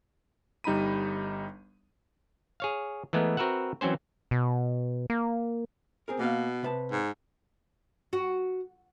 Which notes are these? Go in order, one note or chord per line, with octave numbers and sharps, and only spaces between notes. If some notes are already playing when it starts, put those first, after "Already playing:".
G1 G3 D#4 A#5 B5 D#7
G#4 C#5 F5
E3 G#3 A3 B3 A#4
C4 F#4 A#4 B4 E5 F#5
E3 F#3 C4 C#4 C5
B2
A#3
C4 G#4 A#4
B2 A#3 F5
C3 B4 A5
G#2
F#4